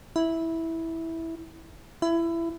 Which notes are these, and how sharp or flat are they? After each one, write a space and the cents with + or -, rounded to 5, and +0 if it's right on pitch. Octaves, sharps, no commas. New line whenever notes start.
E4 -10
E4 +20